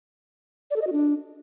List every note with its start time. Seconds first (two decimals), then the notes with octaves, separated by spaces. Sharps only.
0.71 D5
0.76 A4
0.82 D#5
0.87 F#4
0.92 D4